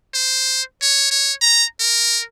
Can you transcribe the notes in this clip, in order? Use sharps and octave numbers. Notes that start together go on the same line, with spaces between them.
C5
C#5
C#5
A#5
A#4